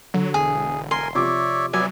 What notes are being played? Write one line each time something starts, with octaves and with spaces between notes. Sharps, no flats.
D3 F#3
E1 G#4
A#4 G#5 C6
C3 F3 C#5 D5 E5 D6
F#3 B3 D5 E5 G#5